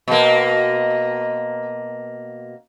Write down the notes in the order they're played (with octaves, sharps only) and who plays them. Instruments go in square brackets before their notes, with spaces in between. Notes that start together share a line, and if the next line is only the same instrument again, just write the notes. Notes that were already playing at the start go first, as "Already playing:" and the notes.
[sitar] B2 A#3